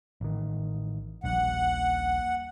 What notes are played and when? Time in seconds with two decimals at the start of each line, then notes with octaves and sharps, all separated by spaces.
0.21 A1 D#3
1.24 D#1 A#1 F#5